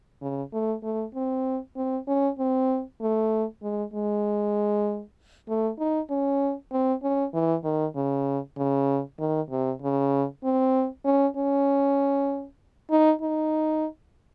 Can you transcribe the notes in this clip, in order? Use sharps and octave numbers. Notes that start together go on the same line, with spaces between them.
C#3
A3
A3
C4
C4
C#4
C4
A3
G#3
G#3
A3
D#4
C#4
C4
C#4
E3
D#3
C#3
C#3
D#3
C3
C#3
C4
C#4
C#4
D#4
D#4